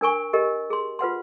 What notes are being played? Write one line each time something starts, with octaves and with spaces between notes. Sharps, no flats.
D4 A#4 G#5 C#6
G4 A#4 D#5
G#4 C6
F4 B4 F#5 C6